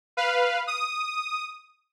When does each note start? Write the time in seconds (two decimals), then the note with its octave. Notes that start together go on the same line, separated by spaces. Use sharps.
0.17 B4 F5
0.67 D#6